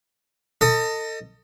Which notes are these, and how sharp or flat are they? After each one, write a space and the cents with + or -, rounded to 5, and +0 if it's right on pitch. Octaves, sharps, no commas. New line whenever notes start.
A4 +30 D#5 +0